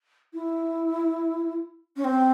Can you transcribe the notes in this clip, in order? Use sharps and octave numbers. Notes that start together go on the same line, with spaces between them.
E4
C#4
C4